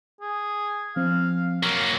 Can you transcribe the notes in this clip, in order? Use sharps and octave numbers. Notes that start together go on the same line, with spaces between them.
G#4
F3 C4 F5
F#3 A#3 A#4